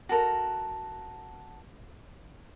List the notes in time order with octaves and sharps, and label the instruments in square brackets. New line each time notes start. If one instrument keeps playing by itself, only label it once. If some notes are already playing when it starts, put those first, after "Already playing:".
[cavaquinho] F#4 A4 A#4